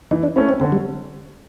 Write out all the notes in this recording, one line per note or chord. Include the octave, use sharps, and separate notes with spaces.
E3 D#4
D4
A3 C4 C#4 E4
C4
D3 C4
G3